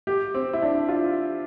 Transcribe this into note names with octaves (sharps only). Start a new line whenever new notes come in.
G4
C4
E4
D4
F4